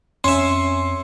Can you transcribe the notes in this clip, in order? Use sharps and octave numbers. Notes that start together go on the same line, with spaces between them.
F2 C#4 E5 C6